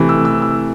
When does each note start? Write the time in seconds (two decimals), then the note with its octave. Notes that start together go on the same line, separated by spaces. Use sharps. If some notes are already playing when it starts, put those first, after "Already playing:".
Already playing: C3 E3 A3
0.09 E6
0.25 E6
0.42 E6